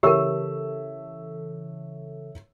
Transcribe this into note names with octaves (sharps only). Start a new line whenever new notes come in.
C#3 E3 G4 A4 A#4 C#5 E5 E6